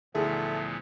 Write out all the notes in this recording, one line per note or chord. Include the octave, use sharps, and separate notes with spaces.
D2 A#2 E3 F3 A3 B3 G#4